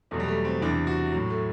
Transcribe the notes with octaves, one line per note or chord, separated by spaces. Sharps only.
E2 B2 F#3 A3
G3
A3
C4
E2 C3 E3 D4
F#4
A2 F#3
A3